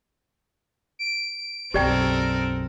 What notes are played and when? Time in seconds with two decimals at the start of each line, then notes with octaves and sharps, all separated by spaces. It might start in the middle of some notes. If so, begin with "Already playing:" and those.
0.99 D7
1.74 B1 F#2 C4 G4 A4 A#4 D5 G5